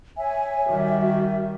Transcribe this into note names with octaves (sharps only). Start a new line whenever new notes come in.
C#5 E5 G#5
D#3 G3 F#4